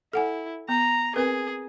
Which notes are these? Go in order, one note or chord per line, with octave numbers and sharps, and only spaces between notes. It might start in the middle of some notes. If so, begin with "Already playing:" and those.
E4 A4 F#5 G#5
B3 A#5
C4 G#4 A#4 B4